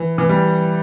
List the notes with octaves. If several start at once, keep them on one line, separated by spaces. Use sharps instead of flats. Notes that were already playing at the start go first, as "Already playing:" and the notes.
Already playing: E3
E3
G3